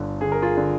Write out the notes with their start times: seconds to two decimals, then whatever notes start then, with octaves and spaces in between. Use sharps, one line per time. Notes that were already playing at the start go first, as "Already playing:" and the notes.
Already playing: G1 D3
0.21 D3 G#4
0.32 A#4
0.42 F4 G#4
0.57 D3